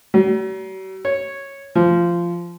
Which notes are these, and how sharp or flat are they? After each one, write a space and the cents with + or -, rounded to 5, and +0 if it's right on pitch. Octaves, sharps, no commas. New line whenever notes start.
F#3 +45
C#5 -5
F3 -15